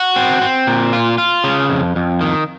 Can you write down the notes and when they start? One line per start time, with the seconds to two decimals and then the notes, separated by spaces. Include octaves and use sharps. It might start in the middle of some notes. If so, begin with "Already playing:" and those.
Already playing: F#4
0.16 C4
0.41 C4
0.67 A#2
0.93 F4
1.18 F4
1.44 C#3
1.70 F2
1.96 F2
2.21 D#3